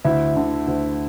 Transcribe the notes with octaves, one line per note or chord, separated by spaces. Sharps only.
D2 E4 E5
D3
D2